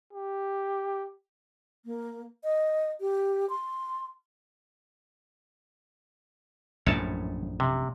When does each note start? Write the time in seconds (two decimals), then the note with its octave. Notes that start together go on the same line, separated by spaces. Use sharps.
0.13 G4
1.85 A#3
2.44 D#5
3.01 G4
3.50 C6
6.87 A#1 F#2 A2 C#5 A5
7.60 C3